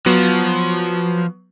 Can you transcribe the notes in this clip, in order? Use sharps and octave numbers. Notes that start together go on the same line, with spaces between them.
F3 F#3 B3